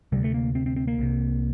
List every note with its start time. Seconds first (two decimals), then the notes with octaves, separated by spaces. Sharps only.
0.12 D2 C3 G3
0.24 A3
0.34 A#3
0.55 C4
0.66 C4
0.76 C4
0.87 A#3
0.99 C2 C3